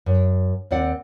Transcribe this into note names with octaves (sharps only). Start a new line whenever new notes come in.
F#2
D#2 C4 D5 F#5